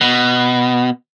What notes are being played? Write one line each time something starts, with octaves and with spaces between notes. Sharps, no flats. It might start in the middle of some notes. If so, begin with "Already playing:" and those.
B2